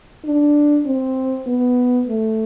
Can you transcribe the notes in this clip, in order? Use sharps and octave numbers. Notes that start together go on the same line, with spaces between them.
D4
C4
B3
A3